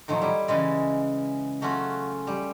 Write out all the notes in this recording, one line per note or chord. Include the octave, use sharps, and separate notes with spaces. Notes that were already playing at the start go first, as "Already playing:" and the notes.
A2 D#3 F3 F#3
G3 E4
C#3 E3 G#3
F#3 A3 C#4 F4 F#4
G3